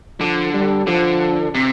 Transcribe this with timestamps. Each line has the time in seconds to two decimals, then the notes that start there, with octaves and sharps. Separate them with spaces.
0.20 D3 F3
0.54 G3
0.87 D3 F3
1.54 C3